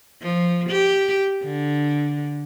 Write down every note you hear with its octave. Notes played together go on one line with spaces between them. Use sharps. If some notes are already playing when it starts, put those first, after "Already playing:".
F3
G4
D3